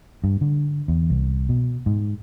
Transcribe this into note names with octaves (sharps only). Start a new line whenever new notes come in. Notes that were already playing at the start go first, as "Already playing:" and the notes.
G2
D3
E2
C2
B2
G#2